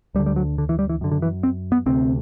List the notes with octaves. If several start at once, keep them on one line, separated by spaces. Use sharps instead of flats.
D2 D3 G3
G3
F#3
D3
E3
G3
E3
F#2 D3
D3
E3
C4
B3
D2 C3 C4